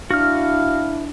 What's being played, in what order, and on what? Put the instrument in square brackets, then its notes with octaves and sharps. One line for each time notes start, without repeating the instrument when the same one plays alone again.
[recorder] D4 [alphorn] E4 [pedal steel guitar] F#4 F6 [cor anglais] F5